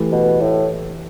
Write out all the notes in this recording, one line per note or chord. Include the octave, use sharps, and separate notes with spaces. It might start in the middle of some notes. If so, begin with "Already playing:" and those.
Already playing: E3 A3 E4 G4
B2
A2